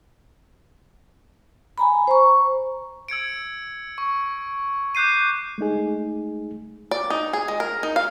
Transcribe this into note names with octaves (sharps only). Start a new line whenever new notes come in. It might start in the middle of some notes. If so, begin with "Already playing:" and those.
G#5 A#5 B5
C5 A#5 C#6
E6 G#6 C#7 D7
C#6
D6 F#6 G6 C7 D#7
G#3 A3 D#4 G#4
D5
D#4
G#4
G#3
A#4
D#4
F5